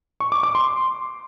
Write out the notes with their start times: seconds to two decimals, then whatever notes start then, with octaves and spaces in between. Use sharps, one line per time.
0.20 C#6
0.32 D6
0.43 D6
0.55 C6